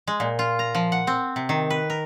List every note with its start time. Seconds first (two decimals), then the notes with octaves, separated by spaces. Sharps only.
0.07 G#3
0.20 A#2
0.39 F4
0.59 A#5
0.75 F3
0.92 F#5
1.07 C4
1.36 C3
1.49 D#3
1.70 B4
1.90 A#4